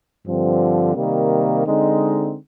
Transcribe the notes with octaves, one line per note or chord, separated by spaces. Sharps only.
G2 D3 F3 C4
C3 D#3 G3 A#3
D3 G#3 C4 D#4